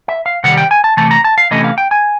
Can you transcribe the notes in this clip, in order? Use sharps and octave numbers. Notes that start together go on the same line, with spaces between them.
E5
F5
C3 D#3 G3 F#5
G5
G#5
A5
C3 E3 A3 A5
A#5
A5
F5
C3 E3 A3 C#4 D#5
F5
G5
G#5